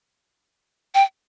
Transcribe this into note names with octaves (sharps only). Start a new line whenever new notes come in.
G5